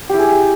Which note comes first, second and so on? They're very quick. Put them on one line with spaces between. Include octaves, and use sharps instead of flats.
G4 E4 G#4